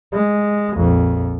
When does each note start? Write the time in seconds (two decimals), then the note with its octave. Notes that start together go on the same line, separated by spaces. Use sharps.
0.12 G#3
0.76 A#1 F2